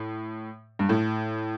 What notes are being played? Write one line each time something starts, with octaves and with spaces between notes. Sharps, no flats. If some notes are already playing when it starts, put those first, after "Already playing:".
Already playing: A2
G2
A2